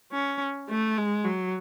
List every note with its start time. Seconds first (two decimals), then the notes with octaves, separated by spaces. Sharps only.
0.12 C#4
0.69 A3
0.97 G#3
1.25 F#3